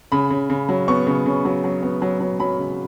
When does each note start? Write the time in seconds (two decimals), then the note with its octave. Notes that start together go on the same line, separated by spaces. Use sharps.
0.12 C#3 B5
0.30 C#3
0.50 C#3
0.69 F#3
0.88 B3 C#6
1.07 C#3
1.26 C#3
1.45 F#3
1.64 F#3
1.83 B3
2.02 F#3
2.21 F#3
2.40 F#3 B5
2.59 C#3